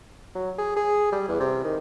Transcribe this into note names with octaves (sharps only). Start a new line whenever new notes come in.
F#3
G#4
G#4
G3
E2
C3
D#3